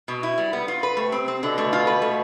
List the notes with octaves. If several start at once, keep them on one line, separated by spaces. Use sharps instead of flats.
B2
E4
G3
B3
F4
B4
C3 A3
C4
C4
B2 D3
A3
F4
B4
A3